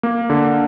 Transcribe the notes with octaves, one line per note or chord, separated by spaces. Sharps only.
A#3
D3